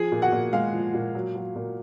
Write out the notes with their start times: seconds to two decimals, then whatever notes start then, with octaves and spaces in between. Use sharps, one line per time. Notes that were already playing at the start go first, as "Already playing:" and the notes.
Already playing: F3 G#4 G#5
0.12 A#2
0.22 F#4 F#5
0.32 A#2
0.53 G#3 F5
0.73 F3
0.94 A#2
1.15 F#3
1.35 F#3
1.56 A#2